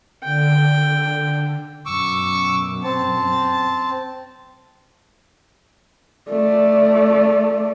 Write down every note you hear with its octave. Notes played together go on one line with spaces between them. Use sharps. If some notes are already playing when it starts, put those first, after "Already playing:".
D3 G5
F#2 B2 C#6 D6 E6
C4 A5
A3 D5